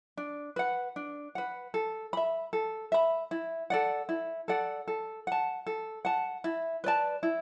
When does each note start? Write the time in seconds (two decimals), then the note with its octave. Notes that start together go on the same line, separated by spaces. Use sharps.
0.17 D4
0.56 B4 F#5
0.96 D4
1.35 B4 F#5
1.74 A4
2.13 E5 B5
2.53 A4
2.92 E5 B5
3.31 E4
3.70 A4 D5 F#5
4.09 E4
4.48 A4 D5 F#5
4.88 A4
5.27 F#5 A5
5.67 A4
6.05 F#5 A5
6.44 E4
6.84 B4 D5 A5
7.23 E4